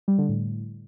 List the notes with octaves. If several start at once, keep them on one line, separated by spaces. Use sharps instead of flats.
G3
D3
A2